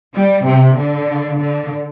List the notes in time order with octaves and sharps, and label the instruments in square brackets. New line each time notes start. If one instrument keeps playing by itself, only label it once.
[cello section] G3
C3
D3
D3